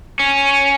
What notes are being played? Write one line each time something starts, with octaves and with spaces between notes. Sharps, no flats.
C#4